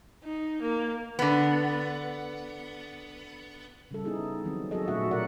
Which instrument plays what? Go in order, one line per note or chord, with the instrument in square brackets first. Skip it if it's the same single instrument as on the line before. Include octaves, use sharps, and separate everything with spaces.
[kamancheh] D#4
A#3
[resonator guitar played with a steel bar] D3 B3
[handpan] C#3 G3 A4
B3 D#4 E4 G#4
D#3 F#3 C4
F#3 F#4 G#4 A4 D#5
A#2 A3 C#4 F#4 E5 F#5
B2 A#4 D5 F#5